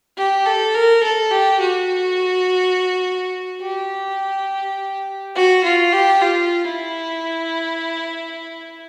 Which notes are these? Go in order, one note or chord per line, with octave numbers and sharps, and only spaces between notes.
G4
A4
A#4
A4
G4
F#4
G4
F#4
F4
G4
F4
E4